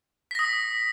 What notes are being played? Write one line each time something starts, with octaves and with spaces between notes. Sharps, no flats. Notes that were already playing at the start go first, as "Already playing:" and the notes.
D#6 A#6 B6